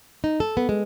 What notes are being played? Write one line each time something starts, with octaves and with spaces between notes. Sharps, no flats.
D#4
A4
B3
G#3